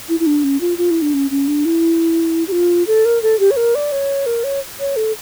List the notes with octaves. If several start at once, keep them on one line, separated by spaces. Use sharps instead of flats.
E4
E4
D4
C#4
F4
F4
E4
D4
C#4
C#4
D4
E4
G4
F4
A4
A#4
A4
G4
C#5
A#4
D5
C#5
A#4
C#5
C#5
A4